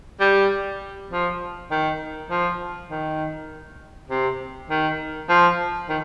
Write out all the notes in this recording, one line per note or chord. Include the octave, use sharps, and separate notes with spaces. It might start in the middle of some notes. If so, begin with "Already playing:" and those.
G3
F3
D#3
F3
D#3
C3
D#3
F3
D#3